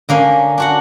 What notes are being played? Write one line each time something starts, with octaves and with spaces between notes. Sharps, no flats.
D3 A#3 C#4
D4 F#4 F#5